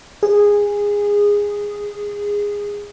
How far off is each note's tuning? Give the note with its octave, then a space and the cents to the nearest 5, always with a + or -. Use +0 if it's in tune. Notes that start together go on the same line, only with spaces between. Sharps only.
G#4 -15